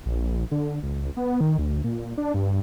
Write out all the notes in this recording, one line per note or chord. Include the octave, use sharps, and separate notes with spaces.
A#1
D3
C#2
B3
D#3
D2
A#2
D4
G2